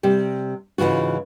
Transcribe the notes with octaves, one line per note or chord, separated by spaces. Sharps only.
C3 G3
G#2 C#3 E3 F4 F#4